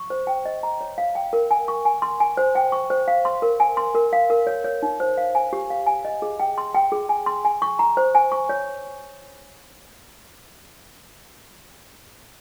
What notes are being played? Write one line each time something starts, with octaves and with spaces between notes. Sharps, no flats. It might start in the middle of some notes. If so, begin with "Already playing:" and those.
Already playing: C#6
C5
G5
D#5
A#5
C#5
F5
G5
A#4
G#5
C#6
G#5
C6
G#5
C5
G5
C#6
C5
F5
C6
A#4
G#5
C6
A#4
F5
A#4
C#5
C#5
D#4
C5
F5
G#5
G4
F5
G#5
D#5
G#4
G5
C6
G5
G#4
G#5
C6
G#5
C#6
A#5
C5
G#5
C#6
C#5